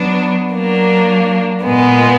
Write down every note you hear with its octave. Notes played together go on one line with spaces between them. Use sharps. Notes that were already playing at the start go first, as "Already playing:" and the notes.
Already playing: F#3 B3 D4
F#3 A#3 D4
A#2 G#3 B3